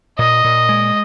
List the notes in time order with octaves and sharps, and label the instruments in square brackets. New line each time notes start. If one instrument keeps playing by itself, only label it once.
[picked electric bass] A#2 [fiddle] D#5
[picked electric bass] A#2
G#3